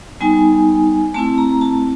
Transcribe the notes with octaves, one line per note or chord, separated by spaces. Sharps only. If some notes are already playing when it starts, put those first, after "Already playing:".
G3 B3 D#4 G#5
A3 C4 E4 A5
A#5
A5